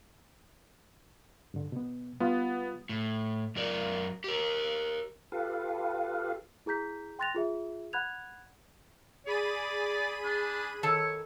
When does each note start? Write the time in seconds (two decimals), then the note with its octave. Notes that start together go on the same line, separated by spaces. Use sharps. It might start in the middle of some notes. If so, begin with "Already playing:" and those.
1.54 G2 D3
1.72 B2 B3
2.20 G3 B3 F4
2.89 A2
3.56 F#2 F#3 A#4 D5
4.24 G4 A#4
5.32 F4 G4 A4 B4 F5
6.66 E4 G#4 A#5 G6 B6
7.19 G5 C6 F#6 A6 A#6 F7
7.35 F4 G#4 E5
7.93 F#5 B5 F#6 G#6 F7
9.26 G#4 D5 B5 D#7
10.24 D4
10.83 D#3 A4 C#5 A5